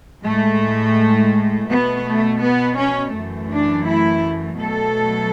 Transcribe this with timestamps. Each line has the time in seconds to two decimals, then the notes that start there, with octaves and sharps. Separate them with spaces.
0.24 A2 G#3 A3
1.69 B2 A3 B3
2.06 A3
2.42 B3
2.78 C#4
3.14 F#2 E3 A3
3.50 D4
3.87 E4
4.58 B2 F#3 A3 A4